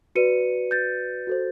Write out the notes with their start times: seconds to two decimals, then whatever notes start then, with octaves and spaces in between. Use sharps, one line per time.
0.15 F#4 B4 D5 C#7 D#7
0.71 G6 A6
1.27 F#4 A4 C5